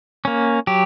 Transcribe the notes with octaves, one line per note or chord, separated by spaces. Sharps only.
A#3 C#4
F#3 G4